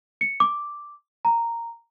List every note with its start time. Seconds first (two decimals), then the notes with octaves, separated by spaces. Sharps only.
0.21 C#7
0.40 D6
1.25 A#5